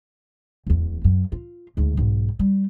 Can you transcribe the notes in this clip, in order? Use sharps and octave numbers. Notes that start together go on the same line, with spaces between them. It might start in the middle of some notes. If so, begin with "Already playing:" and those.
D1 E2
F#2
F4
D2 G#2
B1 G#2
G3